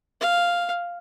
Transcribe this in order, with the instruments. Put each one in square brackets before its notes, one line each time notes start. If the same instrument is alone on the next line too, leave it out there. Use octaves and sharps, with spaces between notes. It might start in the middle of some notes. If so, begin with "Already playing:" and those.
[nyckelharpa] F5